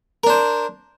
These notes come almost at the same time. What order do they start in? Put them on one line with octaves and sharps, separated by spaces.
A#4 D4 C5